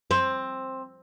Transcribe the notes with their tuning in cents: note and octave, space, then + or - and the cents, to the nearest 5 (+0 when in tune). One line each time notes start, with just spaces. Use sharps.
C4 +10